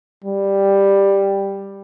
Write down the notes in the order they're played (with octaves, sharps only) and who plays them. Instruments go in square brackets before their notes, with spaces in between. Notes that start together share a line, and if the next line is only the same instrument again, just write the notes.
[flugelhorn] G3